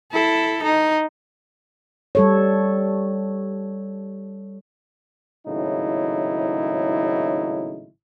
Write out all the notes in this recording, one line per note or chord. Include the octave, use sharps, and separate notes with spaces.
E4 A4
D#4
G3 A4 C#5
G#1 A2 C#3 F#3 D#4 E4